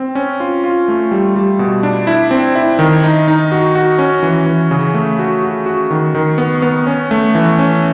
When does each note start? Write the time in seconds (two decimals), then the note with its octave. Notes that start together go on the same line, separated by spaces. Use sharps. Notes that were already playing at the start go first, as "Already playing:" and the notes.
Already playing: C4
0.15 C#4
0.40 F4
0.64 F4
0.88 A3
1.11 G3
1.36 G3
1.59 B2
1.83 D4
2.07 E4
2.31 C4
2.55 E4
2.79 D#3
3.04 D#4
3.28 D#4
3.52 F#4
3.75 F#4
3.99 C#4
4.23 E3
4.46 E3
4.71 C#3
4.94 A3
5.19 F#4
5.43 F#4
5.66 F#4
5.91 D#3
6.15 D#3
6.38 B3
6.62 B3
6.86 C#4
7.11 A3
7.35 E3
7.59 C#4